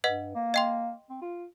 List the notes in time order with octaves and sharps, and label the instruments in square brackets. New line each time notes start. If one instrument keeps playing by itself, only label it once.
[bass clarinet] G2 [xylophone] B4 D#5 F#5
[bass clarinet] A#3
[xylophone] D#5 G5 C6
[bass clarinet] C4
F4